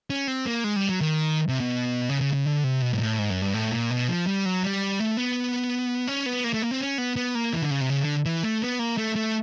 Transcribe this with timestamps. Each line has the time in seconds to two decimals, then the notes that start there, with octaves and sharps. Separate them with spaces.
0.10 C#4
0.28 C4
0.46 A#3
0.64 G#3
0.76 G3
0.89 F#3
1.01 D#3
1.49 C3
1.60 B2
2.09 C#3
2.21 C#3
2.33 C#3
2.45 D3
2.64 C3
2.82 B2
2.93 G#2
3.00 A2
3.19 G#2
3.30 F#2
3.42 G2
3.54 A2
3.72 A#2
3.91 B2
4.08 F3
4.27 G3
4.46 F#3
4.63 G3
4.99 A3
5.17 B3
6.07 C#4
6.26 B3
6.44 A#3
6.54 A3
6.62 A#3
6.71 C4
6.81 C#4
6.98 B3
7.16 B3
7.35 A#3
7.53 E3
7.62 D3
7.71 C#3
7.81 C3
7.90 C#3
8.02 D3
8.26 E3
8.43 A3
8.62 B3
8.79 A#3
8.98 A3
9.16 A3